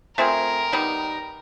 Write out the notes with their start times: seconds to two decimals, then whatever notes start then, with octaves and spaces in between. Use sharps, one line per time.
0.17 A3 C4 F4 G#4 A#4
0.72 D#3 G3 B3 D#4